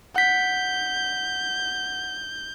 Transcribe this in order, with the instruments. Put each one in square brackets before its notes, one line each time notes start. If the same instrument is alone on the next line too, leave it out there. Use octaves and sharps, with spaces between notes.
[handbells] F#5 B6 [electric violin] G6